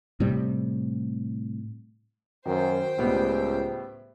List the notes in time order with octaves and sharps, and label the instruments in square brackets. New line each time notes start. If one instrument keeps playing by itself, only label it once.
[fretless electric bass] A2 C3 G3
[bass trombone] F#2 [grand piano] D#3 [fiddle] C5 G5
[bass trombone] C#2 [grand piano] A2 G3 B3